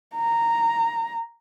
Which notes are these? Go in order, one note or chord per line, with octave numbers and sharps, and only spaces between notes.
A#5